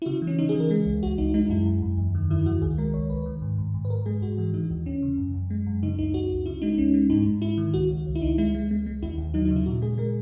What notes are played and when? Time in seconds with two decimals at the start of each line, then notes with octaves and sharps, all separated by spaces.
0.02 E4
0.06 C#3 F#4
0.22 E3
0.27 C#4
0.39 C#3 D#4
0.49 G#4
0.54 E3
0.60 A#4
0.70 G#3 G#4
0.86 C#2
1.03 C#2 F#4
1.18 C#2 D#4
1.34 G#3 D#4
1.50 F#2 E4
1.66 F#2
1.82 F#2
1.98 E2
2.15 D#3
2.30 D#3 E4
2.46 D#3 F#4
2.62 C#2 G#4
2.78 G#3 A#4
2.94 C#2 C#5
3.10 C#2 B4
3.26 D#3
3.42 G#2
3.58 G#2
3.74 G#2
3.85 B4
3.90 G#2 A#4
4.06 G#3 G#4
4.22 G#2 F#4
4.38 E3 F#4
4.54 E3 D#4
4.70 D#2
4.86 D#2 C#4
5.02 C#3
5.18 F#2
5.34 F#2
5.50 G#3
5.66 F#2
5.83 C#3 D#4
5.98 C#2 D#4
6.14 C#2 F#4
6.31 C#2
6.46 C#3 E4
6.62 G#3 D#4
6.78 C#2 C#4
6.94 G#3
7.10 G#2 D#4
7.26 G#2
7.42 G#2 E4
7.58 D#3
7.74 C#2 F#4
7.91 C#2
8.06 C#2
8.15 E4
8.22 C#2 D#4
8.38 G#3 E4
8.55 G#3
8.71 G#3
8.86 G#3
9.03 D#2 E4
9.18 D#2
9.34 F#3 D#4
9.45 D#4
9.50 C#3
9.56 E4
9.66 A#2 F#4
9.82 G#3 G#4
9.98 G#3 A#4